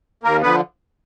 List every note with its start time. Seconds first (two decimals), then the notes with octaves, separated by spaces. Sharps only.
0.23 D#2 A#3 A#4
0.42 D3 F3 B3 B4